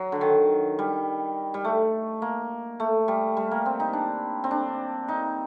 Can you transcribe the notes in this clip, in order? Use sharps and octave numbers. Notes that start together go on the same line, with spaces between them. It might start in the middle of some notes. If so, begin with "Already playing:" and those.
Already playing: F#3
D3
D#3
G3
G3
A3
A#3
A3
G3
G3
A#3
C4
D#4
D4
C4
D4
D#4